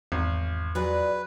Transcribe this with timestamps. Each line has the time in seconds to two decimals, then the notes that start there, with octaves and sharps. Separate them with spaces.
0.12 G#1 E2
0.75 A#2 F#3 G#4 B4 D5